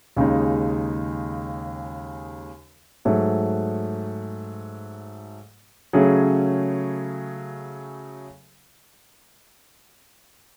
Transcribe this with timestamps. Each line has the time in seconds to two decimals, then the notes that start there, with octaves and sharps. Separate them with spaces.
0.16 D#2 C#3 G#3 D#4
3.05 G#2 F#3 A3
5.93 C#3 F#3 A3 C#4 G#4